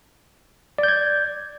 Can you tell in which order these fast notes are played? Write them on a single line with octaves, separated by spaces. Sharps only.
D5 G6 G#6